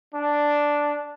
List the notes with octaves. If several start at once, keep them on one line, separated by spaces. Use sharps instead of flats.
D4